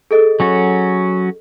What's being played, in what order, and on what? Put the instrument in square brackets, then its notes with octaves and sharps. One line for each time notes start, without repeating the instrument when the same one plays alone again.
[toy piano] G#4 A4 D#5
[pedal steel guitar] F#3 C#4 F#4